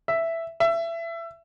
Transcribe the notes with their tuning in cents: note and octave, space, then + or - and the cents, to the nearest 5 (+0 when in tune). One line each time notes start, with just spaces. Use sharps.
E5 +5
E5 +25